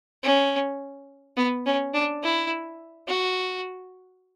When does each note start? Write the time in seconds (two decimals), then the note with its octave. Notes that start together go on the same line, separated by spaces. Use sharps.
0.23 C#4
1.37 B3
1.66 C#4
1.94 D4
2.23 E4
3.08 F#4